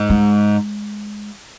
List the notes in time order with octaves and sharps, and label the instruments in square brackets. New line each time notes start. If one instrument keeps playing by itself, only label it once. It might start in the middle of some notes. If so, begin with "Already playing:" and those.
Already playing: [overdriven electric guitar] G#2
[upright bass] G#3